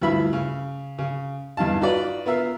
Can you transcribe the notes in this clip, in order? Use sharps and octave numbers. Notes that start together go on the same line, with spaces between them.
D2 G2 E3 F3 E5 B5
C#3
C#3
E2 G2 D#4 F5 A5
D#4 F4 F#4 B4 D5
B3 F4 A#4 E5 F5